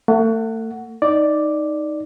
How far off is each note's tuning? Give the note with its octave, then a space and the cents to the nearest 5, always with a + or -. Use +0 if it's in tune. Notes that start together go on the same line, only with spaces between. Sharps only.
A3 +35 F#5 +0
D#4 +0 D5 +0